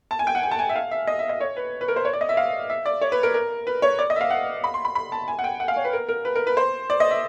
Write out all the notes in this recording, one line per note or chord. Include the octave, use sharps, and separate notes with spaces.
A5
G#5
G5
F#5
G#5
A5
G#5
E5
F5
E5
D#5
E5
D#5
C#5
B4
B4
A#4
C5
C#5
D5
D#5
E5
F5
E5
D5
C#5
B4
A#4
A#4
B4
C#5
D5
D#5
E5
F5
F#5
B5
C6
B5
B5
A5
G#5
F#5
G5
F#5
F5
C#5
B4
A#4
A#4
B4
A#4
B4
C5
D5
D#5
E5